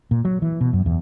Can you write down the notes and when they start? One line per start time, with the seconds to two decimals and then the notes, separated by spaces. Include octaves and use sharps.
0.11 A#2
0.25 F#3
0.42 E3
0.61 B2
0.73 F#2
0.86 E2